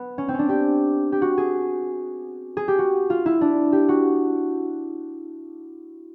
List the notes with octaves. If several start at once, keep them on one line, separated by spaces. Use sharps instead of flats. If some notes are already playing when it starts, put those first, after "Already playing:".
Already playing: B3
C#4
C4
C#4
D4
G4
G4
F#4
G#4
G#4
G4
F#4
F4
E4
D4
G4
F#4